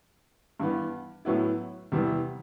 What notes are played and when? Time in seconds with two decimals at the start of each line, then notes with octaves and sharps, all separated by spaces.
0.60 G2 E3 B3
1.25 A2 F#3 B3 E4
1.92 E2 C3 E3 G3 B3